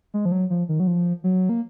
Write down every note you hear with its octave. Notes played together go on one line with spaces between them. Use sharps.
G#3
F3
F#3
F3
D#3
F#3
F3
F#3
A#3